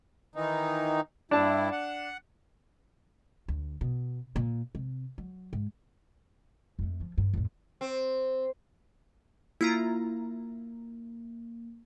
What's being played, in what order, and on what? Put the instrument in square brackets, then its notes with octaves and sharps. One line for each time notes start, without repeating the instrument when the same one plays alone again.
[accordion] D#3 E3 D#4
[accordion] G2 E4 [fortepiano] D4 A5
[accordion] F#5
[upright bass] D2
B2
A#2
C3
F#3
G#2
F2 A3
F3
G2
F2 A2
[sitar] C4
[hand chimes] A#3 [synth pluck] E4 F4 A#5